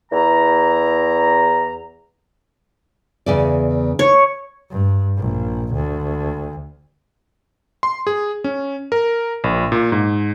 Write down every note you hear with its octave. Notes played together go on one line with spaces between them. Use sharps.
E2 A#5
E2 C#3 D5
C#5
G2
A#1
D2
C6
G#4
C#4
A#4
A#1
A#2
G#2